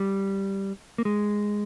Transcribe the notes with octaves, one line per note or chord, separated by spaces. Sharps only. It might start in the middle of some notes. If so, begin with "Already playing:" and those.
Already playing: G3
A#3
G#3